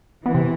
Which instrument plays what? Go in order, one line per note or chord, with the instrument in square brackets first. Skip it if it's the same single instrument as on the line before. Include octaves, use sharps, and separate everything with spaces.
[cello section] E3 [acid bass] B3
[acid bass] C3